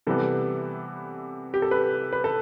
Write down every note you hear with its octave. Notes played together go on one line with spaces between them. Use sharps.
C3 E3 G3 B3 A4
G4
A4
B4
B4
A4